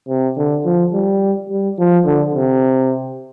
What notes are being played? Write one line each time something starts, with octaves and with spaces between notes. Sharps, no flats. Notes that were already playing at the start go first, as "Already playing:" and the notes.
C3
D3
F3
G3
G3
F3
D3
C3